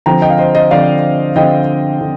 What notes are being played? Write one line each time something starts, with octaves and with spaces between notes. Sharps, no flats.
D3 F3 C4 G5 A#5
D#5 G5
F5
C5 D#5
C5 D#5
D3 F3 C4 D5 F5
D3 F3 C4 D#5 G5
D3